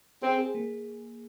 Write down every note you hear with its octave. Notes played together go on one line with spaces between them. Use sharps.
C4 G#4
G#4
A#3